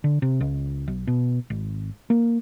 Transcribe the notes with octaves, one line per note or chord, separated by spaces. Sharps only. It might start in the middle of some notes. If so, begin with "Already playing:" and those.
D3
C3
C#2
B1
B2
G#1
A#3